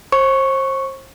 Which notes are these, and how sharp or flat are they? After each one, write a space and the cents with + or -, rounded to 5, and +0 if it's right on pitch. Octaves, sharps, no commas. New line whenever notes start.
C5 +35 C#6 +0